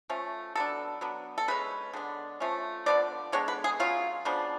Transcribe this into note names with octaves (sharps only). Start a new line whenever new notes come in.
F3 A3 C#4
F#3 B3 D4 A4
F#3 B3 D4
A4
C#3 G#3 C#4 B4
D3 G#3 B3 D4
F3 A3 C#4
D3 F3 B3 D4 D5
D3 G#3 B3 D4 C#5
B4
G#4
C#3 F#3 C#4 F4
C#3 F3 B3 D4